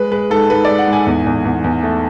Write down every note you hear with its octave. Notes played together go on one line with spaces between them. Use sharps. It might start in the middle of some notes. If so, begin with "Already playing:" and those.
Already playing: G#3 B4
G#3 B4
G#2 A4
G#2 B4
G#3 D5
F#5
G#2
G#5
E2
E2
E2
E2
A3